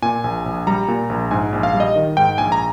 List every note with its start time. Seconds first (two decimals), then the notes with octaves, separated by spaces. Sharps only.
0.02 A#2 G#5
0.24 A#1
0.46 A#1
0.67 G3 A#5
0.88 A#2
1.10 A#1
1.31 G#2 G#5
1.53 A#1
1.63 F5
1.74 G3
1.80 D#5
1.96 D#3
2.17 G#2 G5
2.38 A#1 G#5
2.52 A#5